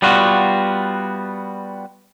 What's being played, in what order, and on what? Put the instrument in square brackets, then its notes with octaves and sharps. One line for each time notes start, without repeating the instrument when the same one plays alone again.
[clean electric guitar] G3 B3 F4 F#4